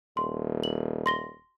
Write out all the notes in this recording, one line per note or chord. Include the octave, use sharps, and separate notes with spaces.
D#1 C6
F#7
C6 A#6 G7